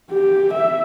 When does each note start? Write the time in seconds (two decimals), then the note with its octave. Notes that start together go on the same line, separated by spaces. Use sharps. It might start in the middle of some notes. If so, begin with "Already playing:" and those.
0.10 G4
0.54 E5